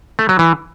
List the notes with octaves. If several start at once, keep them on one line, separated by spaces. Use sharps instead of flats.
A3
F#3
E3